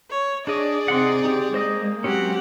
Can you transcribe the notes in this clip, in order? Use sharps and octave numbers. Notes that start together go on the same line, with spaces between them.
C#5
D4 G#4 D5 D#5
C3 C4 D#4 F#5 C6
C#3 G4
G#3 A#3 C5 D#5 D#6
F#3 C4 C#4 G4 F#5